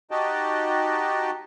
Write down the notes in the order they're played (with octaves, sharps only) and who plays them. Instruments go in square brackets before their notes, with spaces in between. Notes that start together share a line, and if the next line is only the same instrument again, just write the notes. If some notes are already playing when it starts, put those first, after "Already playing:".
[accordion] D#4 F#4 G4 D#5 G5 A5